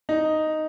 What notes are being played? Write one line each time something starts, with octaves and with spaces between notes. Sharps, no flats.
D#4